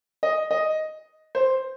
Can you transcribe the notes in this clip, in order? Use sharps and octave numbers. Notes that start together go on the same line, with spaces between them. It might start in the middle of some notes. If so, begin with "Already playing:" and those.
D#5
D#5
C5